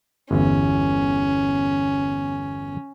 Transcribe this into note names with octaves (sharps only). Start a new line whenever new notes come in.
G1 E2 C#4